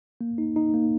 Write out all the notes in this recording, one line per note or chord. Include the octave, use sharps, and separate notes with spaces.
A#3
D#4
D#4
A#3